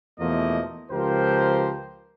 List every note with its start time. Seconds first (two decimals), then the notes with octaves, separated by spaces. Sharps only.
0.19 E2 B2 F3 A3 A#3 D#5
0.91 C#2 F3 G4 A#4 C5